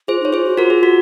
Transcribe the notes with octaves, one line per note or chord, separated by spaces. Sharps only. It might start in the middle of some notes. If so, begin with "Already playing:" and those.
F4 G#4 C5
D#4
C#5
F4 G#4 C5
F#4
F4 F#4 A#4
G#4
F#4